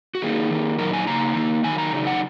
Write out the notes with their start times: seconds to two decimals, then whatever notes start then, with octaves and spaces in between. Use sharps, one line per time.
0.15 F#4
0.22 D#3 A#3 D#4 G#4
0.51 D#3 A#3 D#4
0.78 A#2 F#3 D#4 A#4
0.93 G#5
1.07 C#3 A#3 D#4 A#5
1.35 D#3 A#3 D#4
1.64 D#3 F#3 D#4 G#5
1.78 A#5
1.93 C#3 F#3 D#4
2.07 F#5